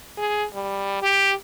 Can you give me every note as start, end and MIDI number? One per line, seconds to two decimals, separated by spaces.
0.18 0.45 68
0.54 1.00 55
1.02 1.33 67